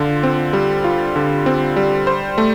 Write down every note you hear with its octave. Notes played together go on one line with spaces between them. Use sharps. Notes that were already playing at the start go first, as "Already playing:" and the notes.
Already playing: D3 F4
C4
G3
F4
D3
C4
G3
C5
A3